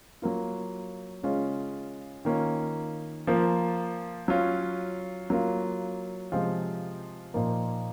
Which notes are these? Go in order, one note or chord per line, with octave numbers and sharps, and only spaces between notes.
F#3 A#3 F4
C#3 G#3 C#4 F4
D#3 A#3 C#4 F4
F3 A#3 F4
F#3 C#4 F4
F#3 A#3 F4
C3 F3 G#3 C4 F4
A#2 F3 A#3 D#4